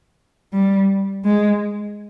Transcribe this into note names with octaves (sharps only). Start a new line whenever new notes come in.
G3
G#3